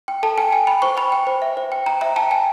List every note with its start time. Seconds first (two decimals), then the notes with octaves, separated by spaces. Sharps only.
0.08 G5
0.23 A4 A5
0.38 G5 G#5
0.52 G5 G#5
0.67 G5 B5
0.82 C5 C#6
0.97 G5 B5
1.12 G5
1.27 C5
1.42 E5
1.57 C5
1.72 G5
1.86 G5 A#5
2.01 E5 A#5
2.16 G5 A5
2.31 G5 G#5